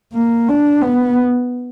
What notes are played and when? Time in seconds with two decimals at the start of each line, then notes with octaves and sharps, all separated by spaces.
0.14 A#3
0.48 D4
0.82 B3